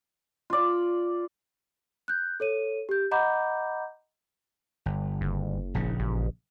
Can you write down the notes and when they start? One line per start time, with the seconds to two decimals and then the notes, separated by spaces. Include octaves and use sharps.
0.50 F4 D5
2.08 F#6 G6
2.40 A4 C#5 D#7
2.89 G4 G6
3.11 D#5 F#5 A#5 B5 D6 G6
4.86 G1
5.21 F#1
5.74 A#1 C#3
6.00 A1